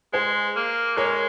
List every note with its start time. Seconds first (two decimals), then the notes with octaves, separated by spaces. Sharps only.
0.13 G#3 G#4 C5
0.56 A#3
0.97 G#3 A#4 C#5